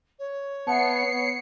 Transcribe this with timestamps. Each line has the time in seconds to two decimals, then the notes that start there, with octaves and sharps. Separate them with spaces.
0.18 C#5
0.67 B3 E5 F#5 A5 C7 C#7
1.05 B3